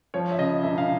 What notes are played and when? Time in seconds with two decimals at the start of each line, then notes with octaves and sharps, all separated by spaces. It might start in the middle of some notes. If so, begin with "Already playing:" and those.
0.14 F3 C#5
0.32 E5
0.39 C#3 D#5
0.63 E1 E5
0.78 F5